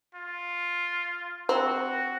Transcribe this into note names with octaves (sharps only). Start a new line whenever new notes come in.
F4
C4 F#4